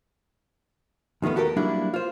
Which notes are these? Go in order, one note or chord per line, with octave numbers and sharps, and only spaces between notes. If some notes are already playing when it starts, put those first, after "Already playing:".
D#2 D#3 F3 A3 B3
F#4 G4 A4 A#4
F#3 G3 A#3 D4 E4
F4 C5